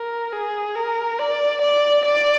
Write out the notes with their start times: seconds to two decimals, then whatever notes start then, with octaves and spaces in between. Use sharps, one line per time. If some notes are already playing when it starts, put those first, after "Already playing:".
Already playing: A#4
0.33 G#4
0.76 A#4
1.19 D5
1.62 D5
2.05 D5